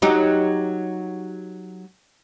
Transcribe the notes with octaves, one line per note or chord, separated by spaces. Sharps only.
F#3 D#4 G4